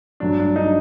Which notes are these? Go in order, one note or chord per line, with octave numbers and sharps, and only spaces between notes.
G2 F#3 A3 D4
D4
D#4